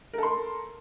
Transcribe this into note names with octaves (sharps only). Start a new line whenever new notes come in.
A4 A#4 C6